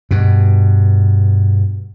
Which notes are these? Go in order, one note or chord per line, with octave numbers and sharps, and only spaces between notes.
G2 B2